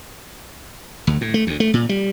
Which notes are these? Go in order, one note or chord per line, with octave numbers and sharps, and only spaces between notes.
D2
A2
A3
D2
A3
A#2
G3